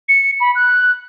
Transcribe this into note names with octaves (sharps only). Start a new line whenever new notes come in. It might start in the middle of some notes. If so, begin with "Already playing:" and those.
C#7
B5
F#6